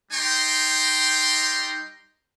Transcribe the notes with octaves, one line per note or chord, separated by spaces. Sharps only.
G3 D#4 G5 A#5 C6